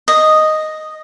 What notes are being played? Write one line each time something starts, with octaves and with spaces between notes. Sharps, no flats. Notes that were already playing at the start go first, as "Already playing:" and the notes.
D#5